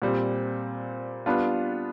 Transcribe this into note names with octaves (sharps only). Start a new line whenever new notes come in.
A#2 G3 C4
G3 B3 D4 F4